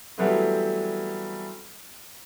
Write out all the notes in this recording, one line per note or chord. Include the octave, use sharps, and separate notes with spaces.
E3 F#3 G3 A3 B3 C4